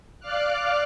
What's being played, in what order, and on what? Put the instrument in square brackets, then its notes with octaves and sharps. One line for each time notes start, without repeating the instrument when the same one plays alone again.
[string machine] D5 F5 D6 F6 F#6